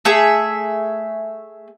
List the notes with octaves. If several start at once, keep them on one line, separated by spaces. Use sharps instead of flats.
A3 G#4 E5